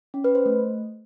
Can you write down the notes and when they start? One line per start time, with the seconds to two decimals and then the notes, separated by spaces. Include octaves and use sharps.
0.14 C#4
0.24 B4
0.35 C5
0.46 A3